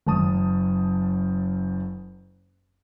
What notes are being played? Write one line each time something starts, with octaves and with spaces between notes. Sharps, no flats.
F#1 F#2 A5 D#6